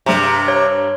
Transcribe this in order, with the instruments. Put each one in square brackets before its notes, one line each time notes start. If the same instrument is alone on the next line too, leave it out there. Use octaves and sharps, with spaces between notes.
[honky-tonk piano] G2 A#5 [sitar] C3
[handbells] C#5